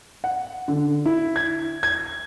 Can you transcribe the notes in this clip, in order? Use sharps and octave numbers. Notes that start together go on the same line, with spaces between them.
F#5
D3
E4
G#6
G#6